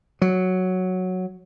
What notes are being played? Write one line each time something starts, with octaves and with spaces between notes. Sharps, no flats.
F#3